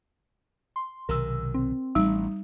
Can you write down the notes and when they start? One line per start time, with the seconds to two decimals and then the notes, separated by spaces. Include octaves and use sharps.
0.76 C6
1.09 B1 C3 D#3 A#4 E6
1.54 C4
1.95 A1 G3 D#4